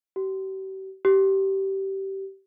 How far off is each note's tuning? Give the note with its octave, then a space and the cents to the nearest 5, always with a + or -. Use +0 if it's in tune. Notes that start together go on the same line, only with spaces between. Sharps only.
G4 -40
G4 -20